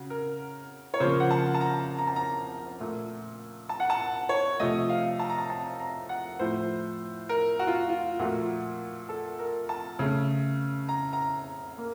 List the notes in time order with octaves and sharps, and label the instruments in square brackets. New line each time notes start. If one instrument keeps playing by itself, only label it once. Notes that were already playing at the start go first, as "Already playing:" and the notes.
Already playing: [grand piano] C#3 F#4
A#4
C#5
C#3 F3 A#3 C5
F#5
A5
A5
A#5
A#5
A5
A#5
A#2 A3
A5
F#5
A5
C#5
C3 F3 A3 D#5
F5
A5
A#5
A5
A5
A#5
F#5
A2 F3 A3 C5
A#4
F#4
F4
F#4
F4
A#2 F3 A3 F#4
A4
A#4
A5
C#3 A3
A#5
A#5
A#3